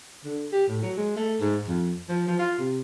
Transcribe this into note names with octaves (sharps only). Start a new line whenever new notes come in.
D3
G4
A2
F#3
G#3
A3
G#2
F2
F3
F3
F4
C3